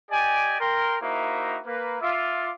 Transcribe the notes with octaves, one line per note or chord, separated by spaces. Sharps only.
G4 D5 D#5 G#5
A#4 G5 C6
A#3 D#4 E4 F#4 C5 E5
A#3 B4
F4 E5 D6